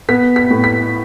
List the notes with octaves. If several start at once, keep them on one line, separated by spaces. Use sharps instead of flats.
B3 B6
B6
A2
B6